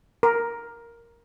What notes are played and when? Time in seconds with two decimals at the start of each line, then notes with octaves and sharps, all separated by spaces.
0.23 A#4